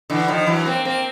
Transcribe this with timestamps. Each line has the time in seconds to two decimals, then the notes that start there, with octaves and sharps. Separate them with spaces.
0.10 D3 E3
0.28 D#3 F3
0.46 E3 F#3
0.66 A#3 C4
0.85 A#3 C4